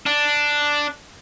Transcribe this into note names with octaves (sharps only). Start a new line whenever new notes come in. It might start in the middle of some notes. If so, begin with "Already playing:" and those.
D4